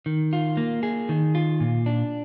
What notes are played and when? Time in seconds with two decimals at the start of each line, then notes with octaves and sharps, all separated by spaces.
0.06 D#3
0.33 F4
0.57 A#3
0.83 G#4
1.09 D#3
1.35 F4
1.60 A#2
1.86 D4